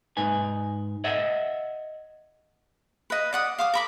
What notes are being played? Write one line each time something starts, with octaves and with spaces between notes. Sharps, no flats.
G#2 D#4 B4 G#5
C#5 D#5 E5 F#5
B4 D#5
D5 F#5 D#6
F5 D6 D#6
A#4 B5 D6